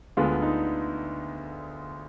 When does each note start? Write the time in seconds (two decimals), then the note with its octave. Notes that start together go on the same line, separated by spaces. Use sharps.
0.17 D2 D3 G#3 B3 F4
0.42 D#4